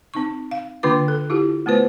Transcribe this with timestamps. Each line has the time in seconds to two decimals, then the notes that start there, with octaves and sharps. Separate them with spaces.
0.14 C4 D#4 C#6
0.51 F5
0.83 D3 A#3 D4 F4 B4 D6
1.08 A4
1.30 E4 F4 G4
1.66 A3 B3 F4 B4 C5